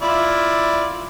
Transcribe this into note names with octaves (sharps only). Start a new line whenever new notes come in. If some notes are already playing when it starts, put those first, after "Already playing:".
E4 F4 D5